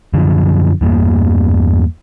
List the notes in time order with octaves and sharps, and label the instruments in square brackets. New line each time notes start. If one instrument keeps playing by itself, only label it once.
[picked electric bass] F#2 D3 F3
E2 G2 A#3